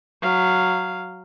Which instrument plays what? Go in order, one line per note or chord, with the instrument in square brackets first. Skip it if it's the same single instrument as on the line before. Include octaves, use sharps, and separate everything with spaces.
[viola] F#3 F5